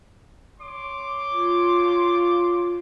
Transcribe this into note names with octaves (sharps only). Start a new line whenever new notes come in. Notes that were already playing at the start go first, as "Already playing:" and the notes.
C#5 C6 D6
F4